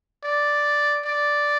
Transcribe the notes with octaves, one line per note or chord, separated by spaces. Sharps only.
D5
D5